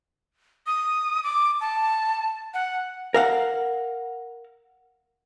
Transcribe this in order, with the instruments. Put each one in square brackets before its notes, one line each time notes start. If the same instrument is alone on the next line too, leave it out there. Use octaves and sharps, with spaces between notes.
[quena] D#6
D6
A5
F#5
[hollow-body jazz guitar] A#4 F5 F#5